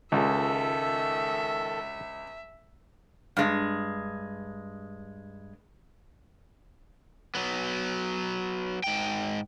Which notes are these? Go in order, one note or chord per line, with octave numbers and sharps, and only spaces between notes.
C#2 D#3 G#3 F4 G#4 A4 E5
G2 G#3
F#3 B3
G#2 G5